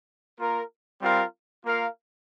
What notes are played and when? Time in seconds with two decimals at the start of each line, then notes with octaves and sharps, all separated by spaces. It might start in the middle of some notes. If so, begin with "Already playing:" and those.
0.40 A#3 F4 A#4
1.02 G3 C4 F4 A#4 F5
1.65 A#3 F4 A#4 F5